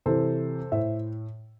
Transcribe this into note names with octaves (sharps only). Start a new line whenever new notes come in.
C3 E3 A4 C5
A2 C5 E5